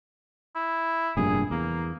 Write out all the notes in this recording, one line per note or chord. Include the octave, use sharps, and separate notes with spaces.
E4
F1 G2 A#2 G#4
E2 A#3